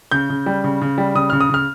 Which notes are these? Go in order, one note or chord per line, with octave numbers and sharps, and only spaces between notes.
C#3 G6
C#3
G3
C#3
C#3
G3
C#3 D#6
C#3 F6
D#6
C#3 F6